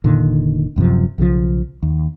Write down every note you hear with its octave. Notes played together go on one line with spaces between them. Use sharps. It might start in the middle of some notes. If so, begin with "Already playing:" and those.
F1 A#2 D3 D#3
D1 F#2 C3 F3
B1 C#3 E3 F3
D#2